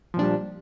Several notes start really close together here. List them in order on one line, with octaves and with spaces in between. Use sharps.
F3 A#2 D4 G3